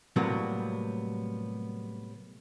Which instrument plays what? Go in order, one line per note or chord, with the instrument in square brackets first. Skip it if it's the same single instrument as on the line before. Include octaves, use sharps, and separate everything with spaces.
[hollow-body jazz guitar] A2 C3 F#3 G3 A#3 B3